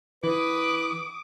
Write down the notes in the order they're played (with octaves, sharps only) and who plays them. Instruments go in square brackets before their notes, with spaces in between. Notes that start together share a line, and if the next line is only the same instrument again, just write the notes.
[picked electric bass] E3 [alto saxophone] B4 [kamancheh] D6 D#6